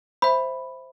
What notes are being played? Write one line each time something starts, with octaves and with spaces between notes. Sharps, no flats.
C5 E5 B5